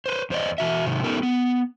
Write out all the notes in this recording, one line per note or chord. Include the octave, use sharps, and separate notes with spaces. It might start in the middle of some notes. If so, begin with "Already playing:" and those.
B4 C5
E2 C5 D5 D#5
E3 F#4 E5
G#2 C3 D#3
B3 D#4 G4 A4 A#4
B3